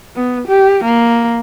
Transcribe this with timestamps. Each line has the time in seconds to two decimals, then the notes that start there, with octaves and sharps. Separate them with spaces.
0.16 B3
0.48 G4
0.85 A#3